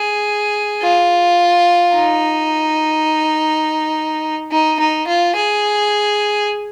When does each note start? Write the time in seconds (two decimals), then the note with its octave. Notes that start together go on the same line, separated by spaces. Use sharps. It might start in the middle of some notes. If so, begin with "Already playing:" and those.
Already playing: G#4
0.83 F4
1.95 D#4
4.52 D#4
4.80 D#4
5.07 F4
5.36 G#4